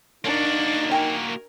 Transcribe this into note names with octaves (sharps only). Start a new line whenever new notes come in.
A#3 D4 D#4 F#4 A#4
A#4 G5 G#5 C#6